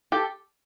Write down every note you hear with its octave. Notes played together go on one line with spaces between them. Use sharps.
G4 A4